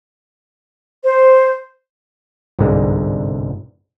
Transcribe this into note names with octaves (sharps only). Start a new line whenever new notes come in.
C5
G1 C2 G#2 D3 G#3